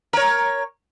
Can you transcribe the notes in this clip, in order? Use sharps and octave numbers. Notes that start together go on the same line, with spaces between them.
A#4 C#5